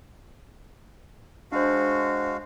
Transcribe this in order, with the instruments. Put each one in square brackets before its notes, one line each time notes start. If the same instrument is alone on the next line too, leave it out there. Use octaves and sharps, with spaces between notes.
[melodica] G#3 F#4 F5 [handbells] D4 C5